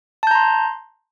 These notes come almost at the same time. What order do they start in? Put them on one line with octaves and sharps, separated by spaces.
A5 G6 A#5 C6